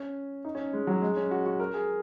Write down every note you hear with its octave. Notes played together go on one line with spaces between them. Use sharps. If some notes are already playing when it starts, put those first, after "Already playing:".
Already playing: C#4
D#4
C#4
G#3
F#3
G#3
C#4
F#4
F#4
A#4
G#4